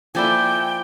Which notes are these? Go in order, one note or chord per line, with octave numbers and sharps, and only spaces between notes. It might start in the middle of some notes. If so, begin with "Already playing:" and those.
F3 A#3 E4 A4 D5 G5 G#5